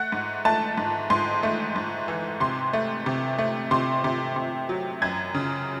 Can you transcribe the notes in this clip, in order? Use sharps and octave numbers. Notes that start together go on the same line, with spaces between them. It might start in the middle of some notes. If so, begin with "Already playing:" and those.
Already playing: A3 F#5
G#2
A3 A5
G#2
G#2 C6
A3
G#2
E3
C3 C6
A3
C3
A3
C3 C6
C3
C3
F#3
F#2 G#6
C#3